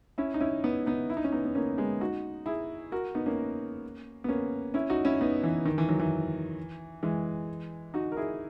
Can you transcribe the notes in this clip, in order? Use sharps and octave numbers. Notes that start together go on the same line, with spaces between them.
C#4 E4
D#4
C#4 E4
B3 D#4
B3 D#4
E4
D#4
C#4
B3 D#4
B3
A#3 C#4
G#3 B3
D#4 F#4
E4 G#4
F#4 A#4
B3 D#4
A#3 C#4
B3
A#3 C#4
C#4 E4
D#4 F#4
C#4 E4
B3 D#4
E3
D#3
E3
D#3 F#3
E3
E3 G#3
D#4 F#4
A#4
E4 G#4